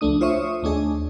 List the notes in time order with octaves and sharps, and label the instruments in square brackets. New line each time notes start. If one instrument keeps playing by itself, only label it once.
[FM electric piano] C#2 F3 A3 D4 D#6
F4 C5 C#5 E5 C#6 D#6
D#2 A3 D4 G#4 D#5